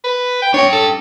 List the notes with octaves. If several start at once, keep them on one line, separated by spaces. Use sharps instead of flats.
B4
G5
D4 C#5 G5
A4